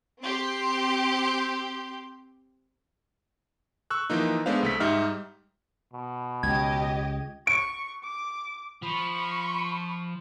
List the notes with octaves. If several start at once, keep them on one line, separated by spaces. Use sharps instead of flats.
C4 G4 C6 G6
C#6 E6 F#6
E3 F3 A#3 D#4
G#3 A3 B3 D4 C5 F5
C2 A3 B6
G#2 G3 D#4 E5 F6
B2
C#2 G4 D#5 G#6
C#6 D7
D6
F3 B5 C#6